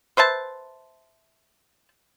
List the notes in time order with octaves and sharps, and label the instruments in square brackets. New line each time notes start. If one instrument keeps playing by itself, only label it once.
[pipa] B4 C5 E5 A5